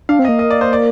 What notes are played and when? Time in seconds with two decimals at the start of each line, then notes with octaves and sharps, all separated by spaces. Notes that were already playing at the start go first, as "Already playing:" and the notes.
0.09 D4 F5
0.19 C4
0.25 A#3 D#5
0.39 D#5
0.51 D5
0.61 C5
0.73 D5